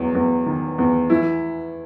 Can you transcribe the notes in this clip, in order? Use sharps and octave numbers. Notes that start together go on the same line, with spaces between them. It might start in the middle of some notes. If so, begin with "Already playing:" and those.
Already playing: E2 F#3
E2
D#3
E2
E3 E4